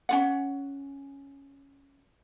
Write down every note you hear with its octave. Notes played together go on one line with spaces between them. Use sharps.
C#4 F4 F#5